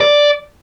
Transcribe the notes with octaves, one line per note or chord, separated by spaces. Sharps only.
D5